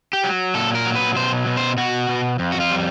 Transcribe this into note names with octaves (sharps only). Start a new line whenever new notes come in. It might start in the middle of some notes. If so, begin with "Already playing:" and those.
G4
F#3
A#2 A4
A#4
F#3
B4
B2 C5
B2
C5
B2 F#4
B2
F2
F#4
F4
G3